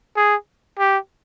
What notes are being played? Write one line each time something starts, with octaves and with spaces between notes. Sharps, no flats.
G#4
G4